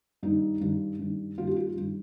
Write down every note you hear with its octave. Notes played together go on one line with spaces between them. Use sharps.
G2 D#3 D#4
G2 D#3
G2 D#3
G2 D#3 F4
G4
F4
G2 D#3